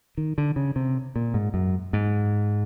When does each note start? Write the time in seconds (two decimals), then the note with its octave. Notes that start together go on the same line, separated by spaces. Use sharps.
0.18 D#3
0.38 D3
0.56 C#3
0.76 C3
1.16 A#2
1.34 G#2
1.54 F#2
1.93 G#2